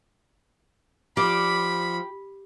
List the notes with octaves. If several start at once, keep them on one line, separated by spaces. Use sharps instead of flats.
F3 G4 D5 B5